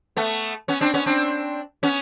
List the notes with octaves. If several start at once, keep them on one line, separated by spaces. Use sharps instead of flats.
A3 B3
B3 C#4
C4 D4
B3 C#4
C4 D4
B3 C#4